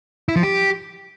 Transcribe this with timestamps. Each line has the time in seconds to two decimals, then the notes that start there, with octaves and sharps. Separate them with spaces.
0.28 E4
0.36 F3
0.43 G4